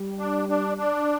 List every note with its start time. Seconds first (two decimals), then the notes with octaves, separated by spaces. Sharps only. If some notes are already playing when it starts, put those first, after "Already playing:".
Already playing: G3
0.19 D4
0.49 D4
0.77 D4